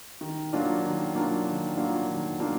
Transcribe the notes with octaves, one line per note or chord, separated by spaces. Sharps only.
D#3
F#3 A#3 D4 F4
D#3
F#3 A#3 D4 F4
D#3
F#3 A#3 D4 F4
D#3
F#3 A#3 D4 F4